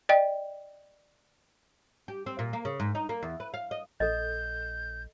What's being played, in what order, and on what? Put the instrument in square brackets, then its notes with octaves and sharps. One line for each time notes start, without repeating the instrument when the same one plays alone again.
[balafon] D5 D#5 G5
[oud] G4
C4
A#2
A#3
C#3
G#2
D#4
A#3
E2
B4
F5
D#5
[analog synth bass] A#1 [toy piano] A4 D#5 [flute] G6